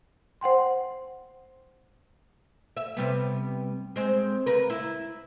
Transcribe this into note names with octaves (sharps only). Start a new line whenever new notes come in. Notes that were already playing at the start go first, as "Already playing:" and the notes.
C5 F#5 G5 C6
E5
C3 G3 B3
G#3 C4
C#3 A#4 B4
E4